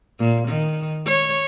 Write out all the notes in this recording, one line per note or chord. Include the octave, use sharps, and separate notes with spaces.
A#2
D#3
C#5